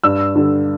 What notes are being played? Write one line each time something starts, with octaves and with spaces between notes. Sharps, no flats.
G2 E6
D3 G3